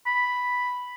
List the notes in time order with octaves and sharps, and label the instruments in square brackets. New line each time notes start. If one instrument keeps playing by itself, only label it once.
[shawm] B5